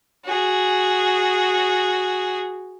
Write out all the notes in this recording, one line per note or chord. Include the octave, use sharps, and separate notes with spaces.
F#4 G#4